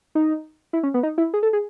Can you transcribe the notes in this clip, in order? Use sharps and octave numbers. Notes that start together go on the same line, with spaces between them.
D#4
E4
C#4
B3
D#4
E4
G#4
A4
G#4